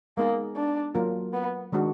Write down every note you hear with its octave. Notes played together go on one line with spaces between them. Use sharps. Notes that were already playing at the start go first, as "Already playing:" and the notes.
G#3 A#3 B3 D#4 G#4
D4
F#3 A#3 F4 A#4
B3
D#3 G#3 D4 F#4